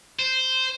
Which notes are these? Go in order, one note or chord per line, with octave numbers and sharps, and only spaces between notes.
C5